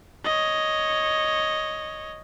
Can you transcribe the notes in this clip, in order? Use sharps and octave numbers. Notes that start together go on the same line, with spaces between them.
C#5 D#5